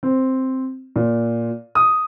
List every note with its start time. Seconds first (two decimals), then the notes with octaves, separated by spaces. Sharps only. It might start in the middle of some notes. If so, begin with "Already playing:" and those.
0.03 C4
0.96 A#2
1.75 D#6